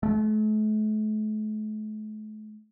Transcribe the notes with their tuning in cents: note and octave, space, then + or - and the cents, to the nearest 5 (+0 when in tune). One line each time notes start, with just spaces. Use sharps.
A3 -40